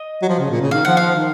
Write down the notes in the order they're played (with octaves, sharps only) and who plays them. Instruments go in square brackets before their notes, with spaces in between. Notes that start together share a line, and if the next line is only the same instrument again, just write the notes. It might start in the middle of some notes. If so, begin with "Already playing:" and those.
Already playing: [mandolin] D#5
[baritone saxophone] F#3
F3
C#3
A#2
C#3
[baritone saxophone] D#3 [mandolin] F5
[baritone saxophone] F3 [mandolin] F#5
[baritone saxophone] F3 [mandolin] F5
[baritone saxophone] D#3